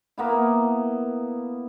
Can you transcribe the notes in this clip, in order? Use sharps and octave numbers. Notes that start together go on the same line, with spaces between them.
A#3 B3 E4